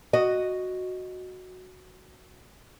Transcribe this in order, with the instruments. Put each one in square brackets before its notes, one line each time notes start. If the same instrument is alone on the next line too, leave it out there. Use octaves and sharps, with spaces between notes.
[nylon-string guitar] F#4 D#5